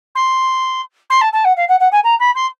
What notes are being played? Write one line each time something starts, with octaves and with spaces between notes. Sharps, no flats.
C6
C6
A5
A5
F#5
F5
F#5
F#5
G#5
A#5
B5
C6